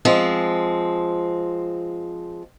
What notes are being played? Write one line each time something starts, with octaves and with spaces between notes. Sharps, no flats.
F3 G#3 C4